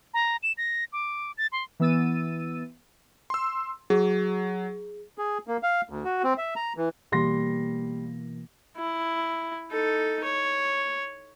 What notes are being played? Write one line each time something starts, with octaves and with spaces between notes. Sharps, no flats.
A#5
E7
A#6
D6
A6
C6
E3 B3 E6 A6 D#7
C6 E6
F#3 G#4
G#4
A#3
F5
D2
F#4
C4
E5
A#5
E3
B2 E3 G3 A#3 C6 A#6
E4
D#4 A4
C#5